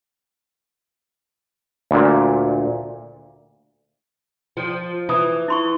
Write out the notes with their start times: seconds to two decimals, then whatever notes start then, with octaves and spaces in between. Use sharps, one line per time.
1.91 D2 A#2
4.57 F3
5.09 E3 F4 D#6
5.48 E4 C6 C#6